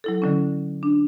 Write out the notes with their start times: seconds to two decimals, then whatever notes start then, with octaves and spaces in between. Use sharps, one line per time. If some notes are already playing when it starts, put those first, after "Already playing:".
0.04 F#3 E4 A4
0.22 D3 F#3 C#4
0.83 D4